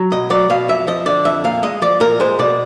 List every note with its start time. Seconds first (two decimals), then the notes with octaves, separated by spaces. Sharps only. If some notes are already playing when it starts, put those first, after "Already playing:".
Already playing: F#3
0.12 B2 D#5
0.30 F#3 D5
0.50 B2 F5
0.68 F2 E5
0.87 F3 D#5
1.06 D3 D5
1.25 F2 E5
1.44 A#2 F5
1.63 G#3 D#5
1.82 F3 D5
2.00 A#2 A#4
2.20 G#3 C5
2.39 B2 D5